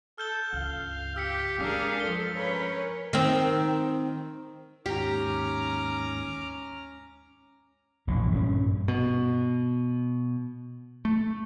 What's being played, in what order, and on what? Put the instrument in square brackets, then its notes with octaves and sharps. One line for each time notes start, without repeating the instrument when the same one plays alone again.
[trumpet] A4 [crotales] F6 G6 G7
[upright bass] C#2 G2 [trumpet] F5
[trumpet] G4 [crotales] E6 B6 C#7
[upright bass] G#3 [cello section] D4 G#4 A#4 [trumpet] F5
[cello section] F3 A4 [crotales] G7
[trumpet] C#4 [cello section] A#4 B4 C#5
[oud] D#3 C4
[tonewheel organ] D#2 G#2 [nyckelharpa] C#4 A#5 [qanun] G4 [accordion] D6 F6
[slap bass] E1 A#1 A2
G2 A#2 C#4
[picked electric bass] B2
A3